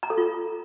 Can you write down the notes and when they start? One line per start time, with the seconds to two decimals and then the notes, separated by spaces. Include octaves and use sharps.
0.03 A#5
0.10 A4
0.18 F4